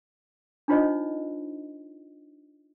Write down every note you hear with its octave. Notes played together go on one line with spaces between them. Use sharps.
D4 D#4 F4 C5 C#5 D#5